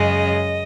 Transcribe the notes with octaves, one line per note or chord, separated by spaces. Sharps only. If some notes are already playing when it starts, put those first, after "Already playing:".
Already playing: F#2 C#3 G#3 D#5